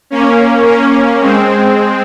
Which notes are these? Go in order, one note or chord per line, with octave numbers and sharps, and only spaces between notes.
A#3 C#4
A#3 C#4
G#3 C4